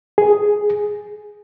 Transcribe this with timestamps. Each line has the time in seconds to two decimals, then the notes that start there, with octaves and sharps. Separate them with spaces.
0.18 G#4